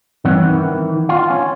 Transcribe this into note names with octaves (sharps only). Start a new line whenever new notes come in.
G2 E3 C4 C#4 F#5
D#3 E3
F4
C#4